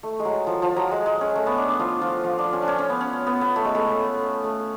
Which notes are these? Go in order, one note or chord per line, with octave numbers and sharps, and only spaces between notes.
A3
G#3
F#3
F3
F3
F#3
G#3
G#3
C#4
A3
B3
D4
D4
F3 F4
F3 F4
F3 F4
D4
C#4
D4
C#4
C#4
B3
C#4
B3
B3
A3
G#3
A3
A3